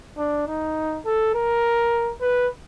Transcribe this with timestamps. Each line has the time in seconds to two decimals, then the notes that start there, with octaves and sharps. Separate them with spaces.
0.18 D4
0.47 D#4
1.05 A4
1.34 A#4
2.21 B4